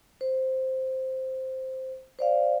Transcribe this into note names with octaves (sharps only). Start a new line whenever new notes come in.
C5
C5 D5 F5